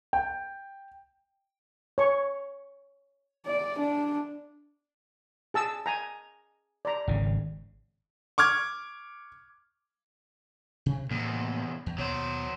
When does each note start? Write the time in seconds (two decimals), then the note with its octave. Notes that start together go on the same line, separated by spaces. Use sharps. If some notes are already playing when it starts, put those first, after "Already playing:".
0.13 G5
1.98 C#5 C#6
3.46 D5
3.78 D4
5.54 G#4 A5 E6
5.86 G#5 A#5
6.85 D5 A#5
7.08 G#1 C#3
8.38 C#6 D6 F6 G#6
10.86 C3
11.11 E2 A2 C3 A#3 B3
11.86 E2
11.98 D#2 B2 F#3 C5